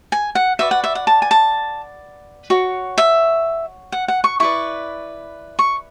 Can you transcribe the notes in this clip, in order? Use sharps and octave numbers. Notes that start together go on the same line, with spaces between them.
G#5
F#5
F#4 B4 D5 E5
F#5
E5
F#5
A5
G#5
A5
F#4 C#5
E5
F#5
F#5
C#6
E4 B4 D5 C#6
C#6